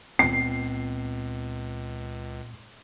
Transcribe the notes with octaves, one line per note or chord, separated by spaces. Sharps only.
C#2 A#2 B3 C4 C7